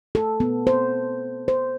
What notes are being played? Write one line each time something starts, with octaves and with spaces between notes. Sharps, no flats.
A4
B3
C5
C5